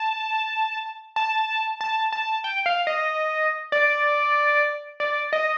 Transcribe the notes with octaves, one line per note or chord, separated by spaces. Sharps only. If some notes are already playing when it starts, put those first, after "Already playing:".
Already playing: A5
A5
A5
A5
G5
F5
D#5
D5
D5
D#5